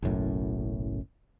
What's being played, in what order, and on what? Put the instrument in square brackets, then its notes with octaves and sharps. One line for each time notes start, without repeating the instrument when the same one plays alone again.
[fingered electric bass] F#1 B1 F#2 A2